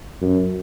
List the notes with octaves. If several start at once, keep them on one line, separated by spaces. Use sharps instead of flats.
F#2